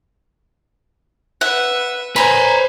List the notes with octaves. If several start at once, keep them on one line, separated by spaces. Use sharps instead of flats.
B4 E5 F#5
B4 C5 G#5 A#5 B5